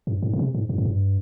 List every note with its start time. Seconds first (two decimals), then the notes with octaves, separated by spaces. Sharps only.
0.07 G2
0.22 G#2
0.33 B2
0.39 C3
0.54 G#2
0.69 G2
0.78 G#2
0.85 G2